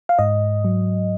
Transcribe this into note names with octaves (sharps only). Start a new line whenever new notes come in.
F5
G#2 D#5
F#3